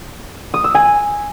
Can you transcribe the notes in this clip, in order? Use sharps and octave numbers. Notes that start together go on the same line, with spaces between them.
D#6
E6
G#5